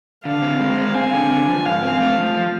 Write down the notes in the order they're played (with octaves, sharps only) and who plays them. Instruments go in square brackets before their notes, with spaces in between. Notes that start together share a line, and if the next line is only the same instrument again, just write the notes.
[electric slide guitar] D3 [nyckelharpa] F5
[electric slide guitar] C4
G#3
C4
[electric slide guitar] C4 [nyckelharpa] G#5
[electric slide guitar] D3
D3
F3
[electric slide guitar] G#2 [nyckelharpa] F5
[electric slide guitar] C4
A3
F3
F3